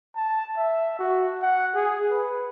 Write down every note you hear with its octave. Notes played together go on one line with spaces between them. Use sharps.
A5
E5
F#4
F#5
G#4
B4